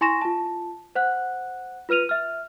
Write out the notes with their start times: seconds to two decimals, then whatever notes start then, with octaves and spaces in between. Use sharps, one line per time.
0.01 E4 G#5 C6 C#6 A#6 E7
0.21 F4 A5
0.95 C5 F#5 F#6
1.89 F4 B4 F6 D#7 F7
2.09 E5 F6